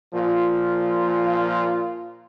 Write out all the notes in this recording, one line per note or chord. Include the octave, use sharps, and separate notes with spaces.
A#2 F3 F4